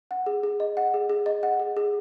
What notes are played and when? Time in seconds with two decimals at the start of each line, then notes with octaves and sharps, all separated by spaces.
0.11 F#5
0.26 G#4
0.43 G#4
0.60 D#5
0.77 F#5
0.94 G#4
1.10 G#4
1.26 D#5
1.43 F#5
1.60 G#4
1.77 G#4